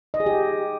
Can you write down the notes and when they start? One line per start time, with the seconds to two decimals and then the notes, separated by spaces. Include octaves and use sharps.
0.14 D#5
0.20 G#4
0.26 G4